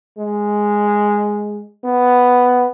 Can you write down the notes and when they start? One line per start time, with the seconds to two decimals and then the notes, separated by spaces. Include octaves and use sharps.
0.18 G#3
1.84 B3